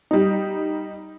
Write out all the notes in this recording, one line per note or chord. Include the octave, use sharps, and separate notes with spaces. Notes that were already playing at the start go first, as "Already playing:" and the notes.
G3 D#4